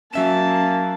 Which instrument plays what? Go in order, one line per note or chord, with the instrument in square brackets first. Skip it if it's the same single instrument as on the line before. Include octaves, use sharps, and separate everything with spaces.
[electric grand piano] F#3 E5 E7 [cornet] A#3 [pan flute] C#4 [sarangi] A5